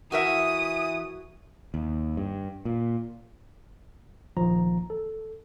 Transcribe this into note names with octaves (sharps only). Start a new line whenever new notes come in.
E3 F#4 A#4 E5 D#6
D#2
G2
A#2
A#1 D#3 F3 A#5
A4